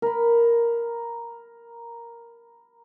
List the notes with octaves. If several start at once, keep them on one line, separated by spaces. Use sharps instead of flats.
A#4 B5